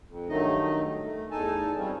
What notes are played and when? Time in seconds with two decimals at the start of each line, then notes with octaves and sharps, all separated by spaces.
0.07 F2
0.29 G2 D#3 F#3 A3 D#4 D#5
1.03 A3
1.31 E2 D#4 A4 G#5 A5
1.77 G3 C4 C#4 D#4 F4 G#4